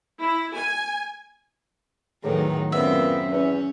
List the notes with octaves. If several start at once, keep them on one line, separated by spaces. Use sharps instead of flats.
E4
G#5
E2 A2 D#3 F#3 G#4 A4 C#5
F#2 A#2 B3 C4 E5
E2 C#4